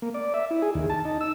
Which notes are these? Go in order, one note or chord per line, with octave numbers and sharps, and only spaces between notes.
A#3
D5
E5
E4
G#4
D#2
A5
D#4
E6